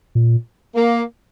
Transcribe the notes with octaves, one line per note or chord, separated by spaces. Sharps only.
A#2
A#3